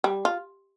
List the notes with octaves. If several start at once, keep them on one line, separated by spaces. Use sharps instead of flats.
G3
F4